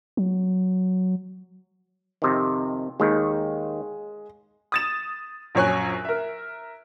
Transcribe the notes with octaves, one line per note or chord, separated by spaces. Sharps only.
F#3
F2 C3 D#3
D#2 D#3 G#3
D#6 A6 E7
A#1 F#2 C#5 G#5 F#6
A#4 E5